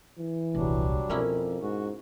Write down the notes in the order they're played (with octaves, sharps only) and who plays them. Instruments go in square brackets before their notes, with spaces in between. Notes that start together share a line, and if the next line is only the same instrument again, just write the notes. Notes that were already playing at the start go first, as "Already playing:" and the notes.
[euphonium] E3
[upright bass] D#1 C2 [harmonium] F#3 G3 D4
[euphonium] F2 [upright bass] B2 [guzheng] A#3 C#4 E4
[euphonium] G#2 [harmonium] F#4